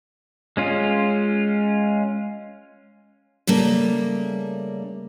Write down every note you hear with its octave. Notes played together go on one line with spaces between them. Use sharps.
G#3 C#4 F4
C#3 G3 A3 A#3